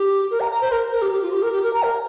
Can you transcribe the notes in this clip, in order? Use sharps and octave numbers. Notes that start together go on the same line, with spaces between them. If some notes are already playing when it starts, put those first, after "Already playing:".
Already playing: G4
A#4
A#5
A#5
C5
A#4
A#4
G4
G4
F4
G4
A#4
G4
A#4
A#5
A#4